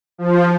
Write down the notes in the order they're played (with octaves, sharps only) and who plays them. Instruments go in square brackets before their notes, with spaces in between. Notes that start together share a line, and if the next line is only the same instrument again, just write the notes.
[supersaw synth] F3